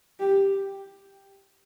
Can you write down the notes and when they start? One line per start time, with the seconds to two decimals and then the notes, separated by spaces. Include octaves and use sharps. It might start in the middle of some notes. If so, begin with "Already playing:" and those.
0.20 G4